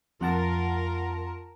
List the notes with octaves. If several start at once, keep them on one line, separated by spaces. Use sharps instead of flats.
F2 F4 A#4 F#5 A5